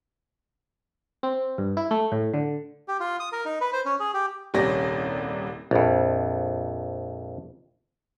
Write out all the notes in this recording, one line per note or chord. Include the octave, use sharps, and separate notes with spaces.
C4
G2
E4
A3
A2
D3
G4
F4
D#6
A#4
D#4
B4
C5
C#4
G#4
G4
D#1 C2 C#4 G4 D5 A#6
A#1 F2